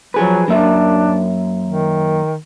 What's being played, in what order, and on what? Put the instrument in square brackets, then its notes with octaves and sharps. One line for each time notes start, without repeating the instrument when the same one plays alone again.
[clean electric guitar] F3 G#4 B4 [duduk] F#3
[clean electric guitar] F#2 A#3 E5 [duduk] D4
[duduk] D#3